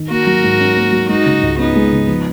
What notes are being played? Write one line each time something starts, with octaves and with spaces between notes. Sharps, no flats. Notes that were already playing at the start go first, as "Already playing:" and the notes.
Already playing: D#3
A#3 F#4 A#4
F#3
G#2
C#4
A#3
F#3
G#3 D#4 F#4
C#3
C#2
B3 C#4 D#4
G#3
C#3
F3